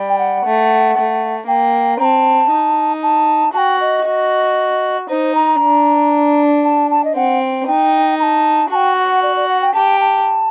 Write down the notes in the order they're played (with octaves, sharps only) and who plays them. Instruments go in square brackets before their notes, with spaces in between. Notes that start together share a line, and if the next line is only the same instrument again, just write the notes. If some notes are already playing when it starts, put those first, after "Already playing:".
Already playing: [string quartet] G3
[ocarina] G5
F#5
[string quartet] A3
A3
[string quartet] A#3 [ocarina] G5
[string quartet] C4 [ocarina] A#5
[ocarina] A5
[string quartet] D#4
[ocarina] A5
[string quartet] F#4 [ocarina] G5 A5
[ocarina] D#5
[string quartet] F#4
[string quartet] D#4 [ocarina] C5
[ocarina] A#5
[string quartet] D4
[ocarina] A5
A5
D#5
[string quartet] C4 [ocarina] F#5
[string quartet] D#4 [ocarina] G5
[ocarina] A#5
A5
[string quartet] F#4 [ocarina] A5
[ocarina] G5
F#5
D5
D5
F#5
G5
[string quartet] G4 [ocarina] A5
[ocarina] A5